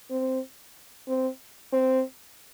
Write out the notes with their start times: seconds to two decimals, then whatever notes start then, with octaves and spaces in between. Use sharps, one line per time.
0.11 C4
1.08 C4
1.73 C4